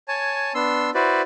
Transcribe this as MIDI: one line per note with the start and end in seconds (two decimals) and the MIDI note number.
0.08 0.53 73
0.08 0.53 80
0.08 0.53 81
0.55 0.90 59
0.55 0.90 62
0.55 0.90 84
0.55 0.90 88
0.94 1.22 64
0.94 1.22 66
0.94 1.22 71
0.94 1.22 72
0.94 1.22 74